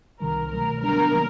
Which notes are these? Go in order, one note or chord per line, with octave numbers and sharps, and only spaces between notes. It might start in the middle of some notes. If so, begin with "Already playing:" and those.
C2 C3 D#3 G3 A#4
B2 F#3 A3 A#4
D3 G3 B3 D4 A#4
C3 D#3 F#3 A#3